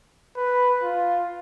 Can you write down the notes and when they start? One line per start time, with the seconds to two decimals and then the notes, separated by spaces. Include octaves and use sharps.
0.36 B4
0.83 F4